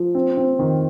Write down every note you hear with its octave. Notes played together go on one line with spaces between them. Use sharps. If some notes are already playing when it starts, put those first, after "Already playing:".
Already playing: F3
C4
C4
D#3